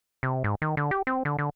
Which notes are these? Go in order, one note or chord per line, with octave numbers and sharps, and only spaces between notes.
C3
G#2
D#3
D3
G4
C4
D3
D3